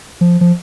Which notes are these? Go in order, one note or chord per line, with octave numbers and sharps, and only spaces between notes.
F3
F3